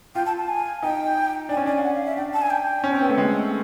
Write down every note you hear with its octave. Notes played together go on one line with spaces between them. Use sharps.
F4 G5
A5
A5
G#5
D#4 G5
D4 G#5
C#4
D4 G#5
F5
F#5
F5
E5
D4 G5
A5
G#5
G5
C#4
C4
B3
A3
G#3